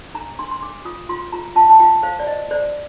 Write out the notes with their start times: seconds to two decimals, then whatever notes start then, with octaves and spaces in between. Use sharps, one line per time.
0.14 D4 A#5
0.39 D4 C6
0.51 C6
0.62 D4 D6
0.85 F4 D#6
1.09 F4 C6
1.32 F4 A#5
1.56 F4 A5
1.70 A5
1.80 F4 G5
2.03 C5 F5
2.19 D5
2.27 C5 D#5
2.51 C5 D5